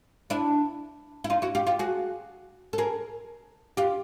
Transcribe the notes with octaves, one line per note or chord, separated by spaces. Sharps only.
D4 E4
E4
D#4 F4
E4 F#4
F4 G4
F4 G4
F#4 G#4
A4
G#4 A#4
F4 G4